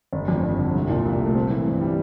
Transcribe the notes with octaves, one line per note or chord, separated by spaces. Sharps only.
G1
F2
G1
D3
C2
A#2
C2
A3
C4
E3
G2
G3